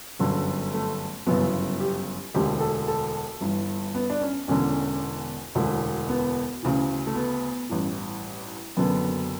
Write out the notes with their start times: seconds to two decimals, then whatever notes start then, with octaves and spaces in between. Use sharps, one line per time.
0.19 G1 F#2 D3
0.74 A3
1.27 G1 F#2 C#3 E3 B3
1.80 G4
2.35 E1 D2 D3 G4
2.61 A4
2.88 A4
3.41 G1 G2 E3
3.95 B3
4.10 D4
4.21 C#4
4.48 E1 E2 D3 C#4
5.55 E1 D2 D3
6.09 B3
6.63 D2 C#3 E3
7.07 A3
7.15 B3
7.70 A1 G2 E3
8.77 F#1 F#2 D3 B3